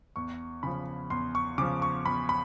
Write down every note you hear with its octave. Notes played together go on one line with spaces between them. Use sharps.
E2 C#6
C#3 F3 B5
E2 C6
C#6
C#3 F3 D6
C#6
E2 B5
B5